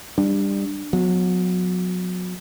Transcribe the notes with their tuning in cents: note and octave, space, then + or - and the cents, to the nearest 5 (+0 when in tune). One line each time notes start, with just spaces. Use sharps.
G3 +15 D4 +10
F#3 -30 B3 +20